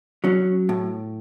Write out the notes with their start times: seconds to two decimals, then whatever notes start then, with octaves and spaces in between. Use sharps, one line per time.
0.24 F#3 C#4
0.69 A2